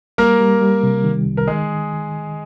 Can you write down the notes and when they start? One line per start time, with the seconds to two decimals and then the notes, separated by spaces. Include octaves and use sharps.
0.18 G3 A#3 A#4
0.40 G3
0.61 G3
0.83 C3
1.04 D#3
1.26 C2
1.37 A#4
1.47 D#3 G#3 G#4